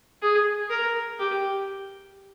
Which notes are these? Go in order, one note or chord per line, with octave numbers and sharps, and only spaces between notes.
G#4
A#4
G4